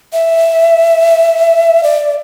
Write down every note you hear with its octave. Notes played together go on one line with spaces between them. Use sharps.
E5
D5